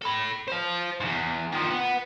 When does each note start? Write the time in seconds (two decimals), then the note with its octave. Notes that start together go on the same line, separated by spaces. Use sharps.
0.02 A4 B5
0.48 C5 F5
1.00 E2 G#2
1.52 D#3 F3
1.71 B4 F#5